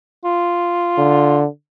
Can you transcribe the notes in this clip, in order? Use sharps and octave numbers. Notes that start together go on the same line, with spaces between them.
F4
D3